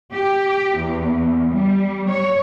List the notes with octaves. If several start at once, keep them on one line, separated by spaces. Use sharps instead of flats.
G4
E2
G3
C#5